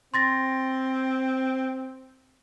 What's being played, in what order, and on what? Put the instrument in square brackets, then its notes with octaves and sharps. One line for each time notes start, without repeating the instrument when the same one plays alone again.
[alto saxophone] C4 [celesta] C6 A6 A#6